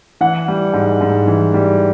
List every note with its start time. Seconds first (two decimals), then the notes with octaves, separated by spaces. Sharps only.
0.21 E3 F#5
0.48 G3
0.74 G#2
1.01 G#2
1.28 E3
1.54 G3